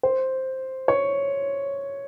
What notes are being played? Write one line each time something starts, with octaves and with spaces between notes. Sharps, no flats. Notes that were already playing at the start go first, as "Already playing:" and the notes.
C5
C#5